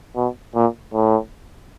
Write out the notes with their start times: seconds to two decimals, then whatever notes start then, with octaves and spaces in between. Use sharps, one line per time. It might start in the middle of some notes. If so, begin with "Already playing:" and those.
0.16 B2
0.55 A#2
0.93 A2